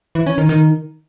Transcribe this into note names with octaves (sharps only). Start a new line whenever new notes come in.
E3
C#4
D#3
D#3